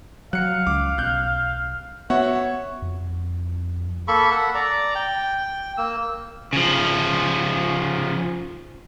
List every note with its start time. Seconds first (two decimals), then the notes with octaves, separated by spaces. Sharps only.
0.33 F#3 F5 F#6 C#7
0.67 C#2 D6
0.98 B1 F#6 G6
2.10 B3 F#4 C#5 E5 F#5
2.82 F2
4.08 A#3 A4 B5 C#6
4.31 A4 F#5
4.55 D5 A#5
4.95 G5
5.78 A#3 E6
6.53 C#3 F3